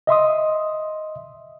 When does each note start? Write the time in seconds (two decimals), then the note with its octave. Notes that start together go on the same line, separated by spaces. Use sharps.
0.07 D#5 E5 C6 D#6